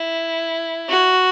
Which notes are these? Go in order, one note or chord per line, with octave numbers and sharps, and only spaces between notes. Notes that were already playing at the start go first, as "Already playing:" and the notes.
Already playing: E4
F#4